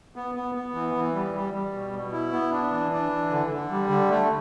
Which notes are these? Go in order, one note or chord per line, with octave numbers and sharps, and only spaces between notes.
B3
B3
B3
E3
E3
G3
G3
G3
B2
B2
E4
B3
D4
E3
D4
E3
D3
D3
G3
D3
A3